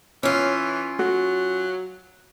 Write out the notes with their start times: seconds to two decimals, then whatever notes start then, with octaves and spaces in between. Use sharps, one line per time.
0.23 E3 C#4 F4
0.99 F#3 F#4